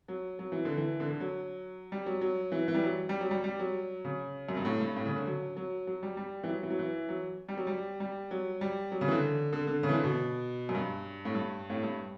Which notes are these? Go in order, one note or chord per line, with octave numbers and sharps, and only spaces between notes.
F#3
F#3
E3
D3
E3
D3
D3
F#3
G3
F#3
F#3
E3
E3
G3
F#3
G3
F#3
G3
G3
F#3
C#3
F#2
G2
A2
G2
A2
C#3
D3
F#3
F#3
F#3
G3
G3
E3
F#3
E3
F#3
E3
F#3
G3
F#3
G3
G3
F#3
G3
F#3
C#3
E3
D3
D3
D3
C#3
E3
D3
B2
F#2
G2
A2
G2
A2
G2